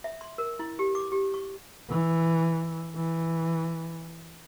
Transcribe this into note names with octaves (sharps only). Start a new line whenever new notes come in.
E5
C6
A#4
E4
G4
D6
G4
C#6
E3
E3